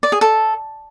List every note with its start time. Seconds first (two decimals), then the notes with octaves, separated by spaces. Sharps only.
0.03 D5
0.12 G#4
0.21 A4